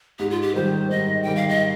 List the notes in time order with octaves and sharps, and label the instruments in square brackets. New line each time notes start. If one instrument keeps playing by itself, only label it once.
[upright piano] G#2 [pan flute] G4
[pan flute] F4
G4
[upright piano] D#3 G3 [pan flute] C5
[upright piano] G#2 [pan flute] D#5
[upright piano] D#3 G3 [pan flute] G5
[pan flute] F5
D#5